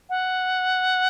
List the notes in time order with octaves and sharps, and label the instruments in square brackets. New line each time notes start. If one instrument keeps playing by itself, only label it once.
[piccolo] F#5